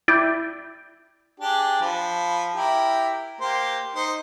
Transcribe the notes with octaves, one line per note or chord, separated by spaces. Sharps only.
E4 D5 G5
D4 G4 G#4
F3 B5
E4 G4 A#4
A#3 G4 C5
D#4 C5